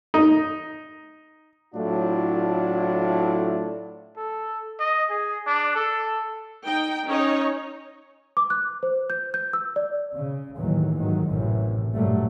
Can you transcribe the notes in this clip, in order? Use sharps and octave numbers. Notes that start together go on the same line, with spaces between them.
D#4
A2 F#3 A3 D4 E4 F4
A4
D#5
G#4
D4
A4
D#4 G5
C#4 D#4 C#5
D6
F#6
C5
G6
G6
E6
D5
C#3
D#2 A2 D#3 E3 F#3
D#2 G#2 D#3 F#3
A1 F#2 A2 C3 E3
G2 A#2 F#3 G3 A3